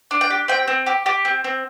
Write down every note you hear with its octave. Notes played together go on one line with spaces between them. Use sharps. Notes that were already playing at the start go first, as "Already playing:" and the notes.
D4
G5
G4
C4 G5
C4
G4
G4
C4
C4